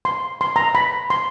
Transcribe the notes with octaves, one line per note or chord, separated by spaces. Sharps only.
C6
C6
A#5
B5
C6